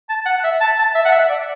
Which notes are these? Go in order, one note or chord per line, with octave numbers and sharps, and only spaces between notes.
A5
F#5
E5
A5
A5
E5
F#5
E5
D5